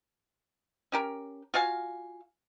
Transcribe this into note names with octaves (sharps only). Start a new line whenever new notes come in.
C#4 G4 A#4
F4 F#4 F5 G#5